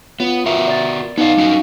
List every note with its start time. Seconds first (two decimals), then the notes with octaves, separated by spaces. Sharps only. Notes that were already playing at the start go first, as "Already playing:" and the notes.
0.20 B3 F4 C#5
0.46 B3 F#4 A#4 E5
0.67 D5 A6
1.18 B3 D#4 D5 F5
1.37 G3 C#4 F#4